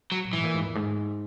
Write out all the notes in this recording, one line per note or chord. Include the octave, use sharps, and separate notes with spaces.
F#3
A#2
G#2 E3
A#2
G#2
E2
G#2